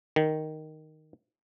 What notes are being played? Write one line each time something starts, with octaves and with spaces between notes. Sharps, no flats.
D#3